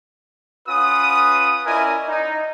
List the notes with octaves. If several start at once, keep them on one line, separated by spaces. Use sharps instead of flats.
C#4 F4 B4 F#5 D#6
C#4 E4 A#4 D5 D#5 G#5
D#4